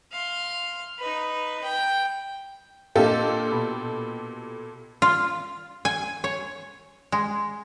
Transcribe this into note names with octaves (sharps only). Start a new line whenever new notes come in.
F5 C6
D#4 B4
G5
A#2 D4 G4 A4 D#5 F5
B2 B5
F4
G#5
C#5
G#3